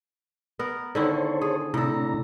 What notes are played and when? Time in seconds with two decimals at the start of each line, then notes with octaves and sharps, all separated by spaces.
0.59 B3 A#4
0.95 D3 D#3 E4 A4 C5 C#5
1.41 G#4
1.74 A2 C3 D4 A4 A#5